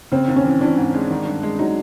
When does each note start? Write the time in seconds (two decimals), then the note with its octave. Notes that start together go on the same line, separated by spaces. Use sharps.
0.12 C#3 C4
0.28 D#2
0.36 C#4
0.44 E3
0.61 E3 D4
0.77 G#2
0.94 G#3
1.10 D#3
1.27 G2
1.43 G#3
1.59 F#3 D#4